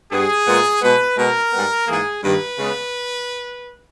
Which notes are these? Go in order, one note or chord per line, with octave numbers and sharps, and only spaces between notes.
G2 G3 B3 G#4
A#2 G#3 B3
B2 G#3 B3 B4
B2 G#3 B3 A#4
G#2 G3 B3
G#2 E3 A#3 G#4
G2 D#3 G3 A#3 B4
C#3 G#3 B3